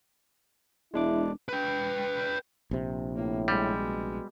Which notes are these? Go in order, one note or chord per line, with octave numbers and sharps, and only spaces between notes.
E1 G#3 D4 E4 D6
B4 G5
A#1 C3
A2 A#3
G3 G#3
B2